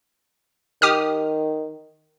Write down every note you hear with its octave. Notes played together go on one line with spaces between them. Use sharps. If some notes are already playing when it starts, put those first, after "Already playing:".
D#3 G4 D#6 F6